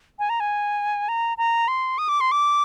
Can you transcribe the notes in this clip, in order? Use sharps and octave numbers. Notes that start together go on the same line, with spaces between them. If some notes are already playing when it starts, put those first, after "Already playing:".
G#5
A#5
G#5
A#5
A#5
C6
D#6
D6
C6
D6